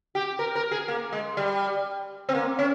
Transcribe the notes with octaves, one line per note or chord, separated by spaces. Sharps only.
G4
A#4
A#4
G#4
A#3
G#3
G3
C4
A#3
C#4